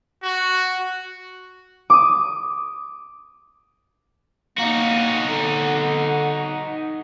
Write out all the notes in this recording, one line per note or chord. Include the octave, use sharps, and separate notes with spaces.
F#4
D6 D#6
A#3 D#4 F#4
D3